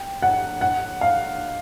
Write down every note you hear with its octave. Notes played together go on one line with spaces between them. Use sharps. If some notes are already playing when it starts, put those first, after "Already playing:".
Already playing: G5
F#5
F#5
F5